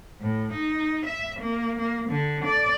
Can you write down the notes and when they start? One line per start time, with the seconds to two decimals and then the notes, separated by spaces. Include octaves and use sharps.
0.21 A2
0.52 D#4
1.05 E5
1.39 A#3
1.79 A#3
2.09 D3
2.44 D5